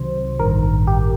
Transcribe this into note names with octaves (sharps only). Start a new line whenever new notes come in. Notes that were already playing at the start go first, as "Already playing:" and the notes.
Already playing: C2 C3 D#3 F#3 C5
A1 G2 D#3 A#4
G4